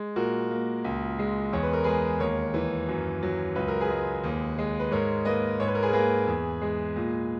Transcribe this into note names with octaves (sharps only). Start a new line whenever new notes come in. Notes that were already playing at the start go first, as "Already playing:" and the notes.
Already playing: G#3
A#2 F#4 A#4
A#3
C#2
G#3
E2 C#5
B4
A#4
G#3 G#4 B4
D#2 A#4 C#5
E3
F#2
F#3
C#2 B4
A#4
G#4 B4
G#3
D#2
G#3
B4
G#2 A#4 C#5
A#3 B4 D#5
G#2 C#5
B4
A#4
G#4 B4
A#4
A#3 G#4 B4
E2
G#3
A#2